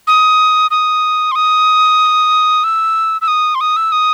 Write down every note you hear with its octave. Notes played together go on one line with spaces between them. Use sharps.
D#6
D#6
C6
D#6
E6
E6
D#6
C6
D#6
E6
D#6